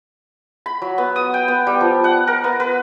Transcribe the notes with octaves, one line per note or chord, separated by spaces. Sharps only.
B5
F#3
B3
D#6
G5
B3
G3
F3
F#5
A#4
B3
B4